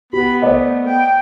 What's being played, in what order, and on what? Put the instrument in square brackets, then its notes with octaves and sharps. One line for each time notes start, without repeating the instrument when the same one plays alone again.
[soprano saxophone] B3 [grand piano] G4 [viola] B5
[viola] A3 [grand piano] C5 D5 D#5
[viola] G5